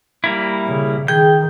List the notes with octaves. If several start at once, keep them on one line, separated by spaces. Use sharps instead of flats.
G3 A#3 E4
C#3
D#3 G#4 G5 G6